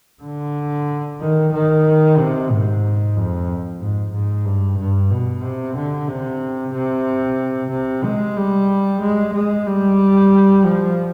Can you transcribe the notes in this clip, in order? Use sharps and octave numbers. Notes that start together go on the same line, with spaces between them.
D3
D#3
D#3
C3
G#2
F2
G#2
G#2
G2
G2
B2
C3
D3
C3
C3
C3
G#3
G3
G#3
G#3
G3
F3